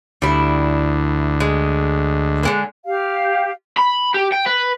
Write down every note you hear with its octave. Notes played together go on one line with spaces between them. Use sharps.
D2 G3 E4
G#3
D3 G#3 A#3
G4 F5
B5
G4
G5
B4